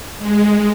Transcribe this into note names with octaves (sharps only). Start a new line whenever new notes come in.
G#3